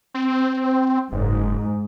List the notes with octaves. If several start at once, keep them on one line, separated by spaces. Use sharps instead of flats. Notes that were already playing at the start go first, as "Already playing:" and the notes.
C4
F#1 G#2